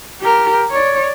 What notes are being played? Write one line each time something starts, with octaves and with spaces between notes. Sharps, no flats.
G4 A#4
C#5 D5